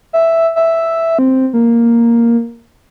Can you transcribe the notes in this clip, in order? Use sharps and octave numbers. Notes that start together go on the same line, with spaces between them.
E5
E5
C4
A#3